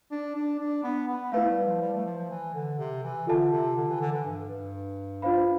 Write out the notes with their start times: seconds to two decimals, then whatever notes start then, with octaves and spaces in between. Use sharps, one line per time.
0.11 D4
0.35 D4
0.59 D4
0.84 B3
1.08 B3
1.32 A3 E4 B4 F5
1.49 G3
1.65 F3
1.81 G3
1.93 A3
2.06 F3
2.17 F3
2.31 E3
2.54 D3
2.78 C3
3.03 E3
3.27 D3 F4 A4 E5 A5
3.52 C3
3.76 D3
3.88 E3
4.00 D3
4.13 E3
4.24 G2
4.49 G2
5.22 D4 F4 C5 F5 B5